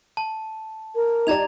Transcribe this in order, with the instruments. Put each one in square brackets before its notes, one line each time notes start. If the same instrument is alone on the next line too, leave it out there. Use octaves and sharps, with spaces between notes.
[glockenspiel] A5
[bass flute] A#4
[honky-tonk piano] D#4 G4 D5 [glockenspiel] A#5 G#6 F7